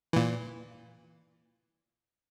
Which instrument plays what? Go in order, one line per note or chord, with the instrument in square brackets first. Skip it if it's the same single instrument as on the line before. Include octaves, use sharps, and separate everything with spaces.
[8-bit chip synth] A#2 E3